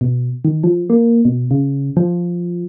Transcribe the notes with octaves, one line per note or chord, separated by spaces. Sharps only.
B2
D#3
F3
A#3
B2
C#3
F3